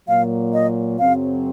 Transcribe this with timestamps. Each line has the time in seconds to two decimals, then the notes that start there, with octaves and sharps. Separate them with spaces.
0.08 A#2 F#3 A#3 F5
0.53 D#5
0.98 F#2 C#3 F#3 C4 F5